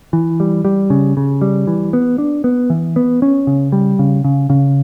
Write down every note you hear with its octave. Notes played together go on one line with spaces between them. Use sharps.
E3
G3
G3
C#3
C#3
G3
E3
B3
D4
B3
E3
B3
C#4
C#3
G3
C#3
C#3
C#3